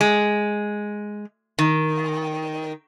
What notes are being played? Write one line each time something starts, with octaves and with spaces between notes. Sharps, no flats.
G#3
D#3